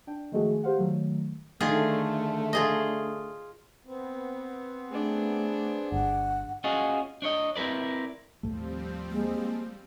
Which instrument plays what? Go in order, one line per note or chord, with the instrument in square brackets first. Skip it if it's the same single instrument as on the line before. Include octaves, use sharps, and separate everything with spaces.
[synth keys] D4 G5
D#3 F3 G#3 A3 F#4 G#4
G4 C5 F5 F#5
D#3 F#3 A3
[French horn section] D3 A3 [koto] D#3 F4 G#4
[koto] F4 G#4 D#5
[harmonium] B3 C4
[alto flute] A3 [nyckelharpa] D4 G#4
[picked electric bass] G1 [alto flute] F#5
[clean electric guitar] C#4 F4 F#4 G#4 D#5
D4 C#5 D#5
C4 E4 A#4 B4 D5
[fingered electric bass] D#2 A2 A3 [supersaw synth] F3 G3 C4
[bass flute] G#3 [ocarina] A#3